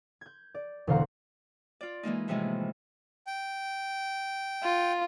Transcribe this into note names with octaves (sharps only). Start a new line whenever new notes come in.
G6 G#6
D5
E1 D3 C5 F5 F#5 A#5
F4 D5
E3 G#3 A#3 D#4
A2 C3 E3 F3 G#3 D#4
G5
F4